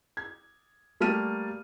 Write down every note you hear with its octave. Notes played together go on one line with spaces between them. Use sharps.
G#6
G3 A3 A#3 A5 F6 D#7